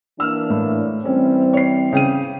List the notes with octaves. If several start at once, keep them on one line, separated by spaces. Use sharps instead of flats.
E3 A#3 D4 E6 F6
A2
E3 G3 C4 C#4
C#5 C7
C#3 G5 D#7